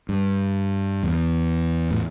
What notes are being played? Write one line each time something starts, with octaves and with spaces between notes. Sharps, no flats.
G2
E2
A2